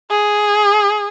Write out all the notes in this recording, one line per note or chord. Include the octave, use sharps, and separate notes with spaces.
G#4